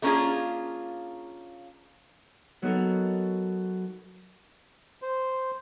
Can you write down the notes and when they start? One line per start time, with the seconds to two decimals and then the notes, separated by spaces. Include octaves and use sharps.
0.02 A3 A#3 C#4 D4 F4 G#4
2.62 F#3 B3 D#4 F#4 A4 A#4
5.02 C5